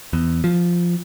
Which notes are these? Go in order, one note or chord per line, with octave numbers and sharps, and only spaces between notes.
E2
F3